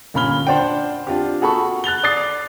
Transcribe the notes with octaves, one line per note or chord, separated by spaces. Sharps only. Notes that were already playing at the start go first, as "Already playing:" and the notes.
G1 A#2 C#4 B5 F6 G7
D4 C5 D5 F#5 G5
C4 D4 F4 G4
F#4 G#4 A4 B5 C#6
F#6 A6 F7 G7
D5 D6 D#6 A6 C7